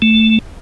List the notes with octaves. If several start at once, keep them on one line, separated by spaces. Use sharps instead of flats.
A3